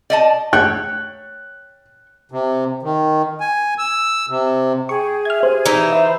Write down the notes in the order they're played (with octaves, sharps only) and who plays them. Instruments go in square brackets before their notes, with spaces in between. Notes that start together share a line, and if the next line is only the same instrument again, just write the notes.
[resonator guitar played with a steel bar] D5 D#5 A5
[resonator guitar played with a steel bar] C#5 G5 [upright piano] F#6
[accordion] C3
D#3
G#5
E6
C3
[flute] G#4 [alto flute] G5 [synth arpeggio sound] C#6
[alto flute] E5 [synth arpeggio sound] F6 G#6
[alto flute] G4 [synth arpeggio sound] C5
[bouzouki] E3 D#4
[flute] C5 [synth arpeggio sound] E5 [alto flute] B5